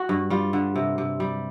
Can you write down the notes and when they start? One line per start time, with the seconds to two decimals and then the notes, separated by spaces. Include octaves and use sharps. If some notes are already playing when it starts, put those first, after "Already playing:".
Already playing: F#4
0.09 G2
0.30 G3 F4
0.53 D3
0.76 C3
0.98 C3
1.20 G3